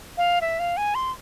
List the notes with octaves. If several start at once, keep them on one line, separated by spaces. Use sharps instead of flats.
F5
E5
F5
G#5
C6